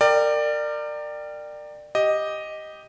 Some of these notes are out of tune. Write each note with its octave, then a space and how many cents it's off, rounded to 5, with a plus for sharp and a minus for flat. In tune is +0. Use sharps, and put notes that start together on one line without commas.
A#4 -20 D5 +20 G5 +0
G4 +0 D#5 +0